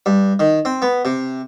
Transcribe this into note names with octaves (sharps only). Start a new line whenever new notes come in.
G2
D#3
C4
B3
C3